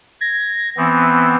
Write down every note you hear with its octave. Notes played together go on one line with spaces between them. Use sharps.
G#6 A#6
E3 B3 C4